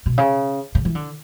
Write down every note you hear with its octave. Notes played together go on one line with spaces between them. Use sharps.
B2
C#3
C#3
E3
D3